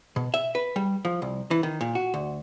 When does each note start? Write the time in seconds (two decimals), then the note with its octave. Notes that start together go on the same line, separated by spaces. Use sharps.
0.16 B2
0.34 E5
0.55 B4
0.76 G3
1.05 F3
1.22 C2
1.51 E3
1.63 D#3
1.81 A#2
1.95 F#4
2.14 D2